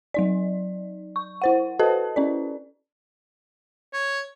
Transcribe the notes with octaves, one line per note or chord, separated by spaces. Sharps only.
F#3 D#4 D5
C#6
E4 C5 F#5
F#4 A4 B4 C5 D#5 A5
C#4 E4 D5
C#5